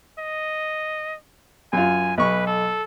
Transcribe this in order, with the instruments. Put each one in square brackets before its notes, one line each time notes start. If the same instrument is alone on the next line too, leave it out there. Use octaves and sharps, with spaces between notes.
[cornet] D#5
[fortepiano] F#2 F4 [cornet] G#5
[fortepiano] B1 C#6 [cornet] B4
[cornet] A4